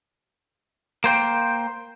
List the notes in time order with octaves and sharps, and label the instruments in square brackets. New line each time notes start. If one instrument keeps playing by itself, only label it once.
[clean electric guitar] A#3 C5 G5